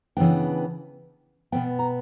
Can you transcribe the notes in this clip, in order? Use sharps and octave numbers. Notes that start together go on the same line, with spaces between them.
C#3 E3 B3 D4 G5
B2 F#3 B3 G5
A#5